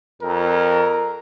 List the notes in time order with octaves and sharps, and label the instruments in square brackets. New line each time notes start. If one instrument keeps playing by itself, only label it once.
[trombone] F2 [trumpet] A#4